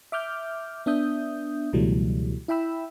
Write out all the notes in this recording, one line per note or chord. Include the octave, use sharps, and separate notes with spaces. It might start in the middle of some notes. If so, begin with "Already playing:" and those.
E5 D6 F6 G6
B3 D4 E5 D#6 G6
C#2 B2 E3 F#3 G3 A3
E4 E5 G5 B5 E6